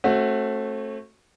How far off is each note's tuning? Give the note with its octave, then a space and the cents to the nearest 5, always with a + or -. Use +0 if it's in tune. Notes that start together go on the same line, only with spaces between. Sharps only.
A3 +0 C4 +40 F#4 +0